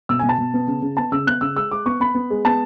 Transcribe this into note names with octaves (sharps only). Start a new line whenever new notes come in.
B2 E6
G#5
B2
A5
B2
B3
C#3
C#3
B3 A5
C#3 E6
B3 F#6
C#3 E6
G#3 E6
G#3 D6
B3 C#6
B3 B5
B3
G#3
B3 A5